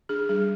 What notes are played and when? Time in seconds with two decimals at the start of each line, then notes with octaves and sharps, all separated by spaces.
0.09 D4 G#4
0.29 G3 G#4